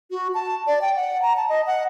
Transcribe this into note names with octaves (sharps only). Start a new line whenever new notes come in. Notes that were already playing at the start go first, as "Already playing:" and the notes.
F#4
A5
D5
G5
F#5
A#5
A5
D#5
F#5